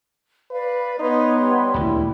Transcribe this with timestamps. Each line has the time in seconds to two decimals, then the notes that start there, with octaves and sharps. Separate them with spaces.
0.51 B4 D5 F5
0.99 B3 D#4 B4 C#5 C6
1.39 G3
1.74 D#1 D2 E4